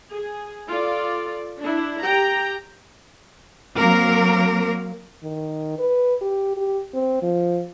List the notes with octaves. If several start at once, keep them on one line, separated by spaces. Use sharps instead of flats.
G#4
F4 A4 D5
D4 E4
G4 G5 A#5
F#3 A#3 C4 A#4
D#3
B4
G4
G4
C4
F3